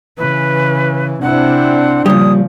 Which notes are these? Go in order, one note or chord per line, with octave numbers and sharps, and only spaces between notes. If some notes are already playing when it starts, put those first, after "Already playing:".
C#3 E3 B4
C3 C4 D4 E4 F#5
A#2 C#3 F3 G3 D#6